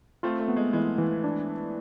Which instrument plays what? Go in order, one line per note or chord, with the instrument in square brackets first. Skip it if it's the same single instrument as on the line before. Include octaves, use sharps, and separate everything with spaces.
[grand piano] A3 C4 [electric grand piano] F4
[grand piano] A3
[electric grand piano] B3
[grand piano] G#3
[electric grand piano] E3 [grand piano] G#3
[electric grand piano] E3
D4